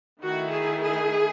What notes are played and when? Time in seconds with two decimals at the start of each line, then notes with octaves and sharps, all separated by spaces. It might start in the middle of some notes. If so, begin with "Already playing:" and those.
0.23 D#3 A3 E4 F#4
0.53 G#4
0.82 G#4